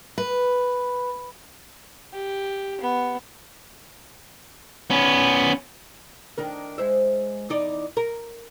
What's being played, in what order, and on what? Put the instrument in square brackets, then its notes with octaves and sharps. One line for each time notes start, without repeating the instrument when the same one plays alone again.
[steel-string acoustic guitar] B4
[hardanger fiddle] G4
B3
[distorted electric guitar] B3 C#4
[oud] D#3 D4 A#4
G#3 C5 E5
E2 D#4 D5
A#4